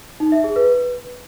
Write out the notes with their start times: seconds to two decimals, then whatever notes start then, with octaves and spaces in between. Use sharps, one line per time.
0.20 D#4
0.32 E5
0.44 G#4
0.56 B4